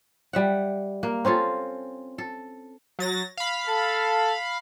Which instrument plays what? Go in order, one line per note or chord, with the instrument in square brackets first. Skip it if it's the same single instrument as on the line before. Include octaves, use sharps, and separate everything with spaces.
[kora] G3 E5 F#5
A#3
C4 C#4 F4 A4
A4
[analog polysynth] F#3 A6 A#6
F5 B5
[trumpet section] A4